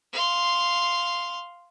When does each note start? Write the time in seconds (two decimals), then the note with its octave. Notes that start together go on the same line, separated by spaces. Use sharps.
0.13 F5 C6